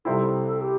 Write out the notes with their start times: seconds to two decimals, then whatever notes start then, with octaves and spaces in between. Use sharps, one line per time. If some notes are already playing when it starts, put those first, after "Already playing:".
0.05 C2 C3 G3 C4 E4 A4
0.61 G4